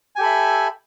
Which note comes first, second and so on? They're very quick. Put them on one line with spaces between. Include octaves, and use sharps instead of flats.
G#5 G4 A4 B5 E5